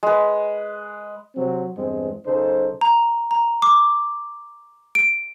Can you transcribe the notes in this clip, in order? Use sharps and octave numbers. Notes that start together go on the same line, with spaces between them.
G#3 B4
C3 F#3 C4
E2 G2 G#3 C4
B1 C#3 D#4 A4 C5
A#5
A#5
D6
D7